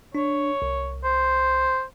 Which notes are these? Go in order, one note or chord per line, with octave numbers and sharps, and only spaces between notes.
D4 C#5
C2
C5